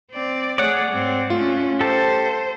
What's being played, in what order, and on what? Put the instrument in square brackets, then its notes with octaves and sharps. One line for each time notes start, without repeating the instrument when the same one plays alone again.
[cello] C4 D5
[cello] A3 G#4 [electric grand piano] C#5 [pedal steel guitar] D5 F#5
[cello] G#2 C4
[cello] A3 C#4 [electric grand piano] F4
[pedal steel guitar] G4 A4 [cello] C5